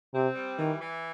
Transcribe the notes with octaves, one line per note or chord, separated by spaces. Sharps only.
C3 C4
G3
D#3 E3
E3